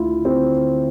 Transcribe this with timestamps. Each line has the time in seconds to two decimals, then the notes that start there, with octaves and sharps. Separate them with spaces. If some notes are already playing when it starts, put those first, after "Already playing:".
Already playing: D2 D3 E4 F4
0.25 C4